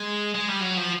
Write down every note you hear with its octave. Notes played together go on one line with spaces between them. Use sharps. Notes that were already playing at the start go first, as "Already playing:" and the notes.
Already playing: G#3
G#3
G3
F#3
F3